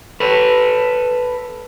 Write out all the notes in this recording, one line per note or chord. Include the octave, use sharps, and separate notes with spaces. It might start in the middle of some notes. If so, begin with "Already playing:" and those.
A4 B4